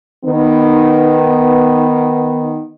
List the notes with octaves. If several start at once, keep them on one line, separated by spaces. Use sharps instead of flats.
D#3 B3